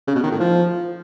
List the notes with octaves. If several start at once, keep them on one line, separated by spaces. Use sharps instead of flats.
C#3
B2
D#3
A2
F3